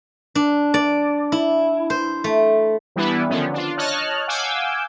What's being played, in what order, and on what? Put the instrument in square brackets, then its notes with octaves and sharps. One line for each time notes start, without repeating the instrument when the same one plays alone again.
[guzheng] D4
D5
E4
C5
A3
[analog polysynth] E3 G3 B3 D4 E4 B4
D3 D#3 F3 B3 C#4
D4 F4
C#5 D#5 A5 F6 F#6
F5 F#5 G#5 D6 E6 G6